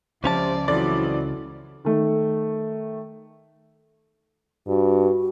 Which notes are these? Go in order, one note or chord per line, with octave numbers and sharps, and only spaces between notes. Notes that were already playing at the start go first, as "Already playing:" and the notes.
C#2 C3 F3 C#4 D5 A5
F2 E3 F#3 D5
D#3 A3
G2 F#4